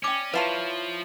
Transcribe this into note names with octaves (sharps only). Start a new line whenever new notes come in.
C#4 D5 G5 D6
F3 E4 F4 B4 C#5 A5